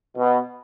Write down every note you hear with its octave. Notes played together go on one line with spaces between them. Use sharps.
B2